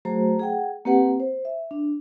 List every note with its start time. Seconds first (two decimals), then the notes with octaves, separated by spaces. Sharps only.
0.05 F#3 A3 F#4 G#4 C5 A#5
0.39 G#4 F#5 G5
0.85 A#3 C4 G4 B4 F#5
1.20 C5
1.45 E5
1.71 D4